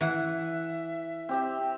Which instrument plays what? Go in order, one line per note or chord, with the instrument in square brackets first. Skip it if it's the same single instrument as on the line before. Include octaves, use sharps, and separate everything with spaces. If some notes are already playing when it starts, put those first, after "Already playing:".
[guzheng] E3 F#5 [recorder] E5
[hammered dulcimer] C4 G4 E5